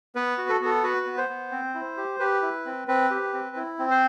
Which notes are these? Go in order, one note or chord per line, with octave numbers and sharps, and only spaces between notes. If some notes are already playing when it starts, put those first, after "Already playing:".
B3 B4
F#4
A4
B3 A4
F#4 B4
B3
C5
B3
C4
E4
G4
G4 B4
E4
C4
C4 B4
G4
C4
E4
C4
C5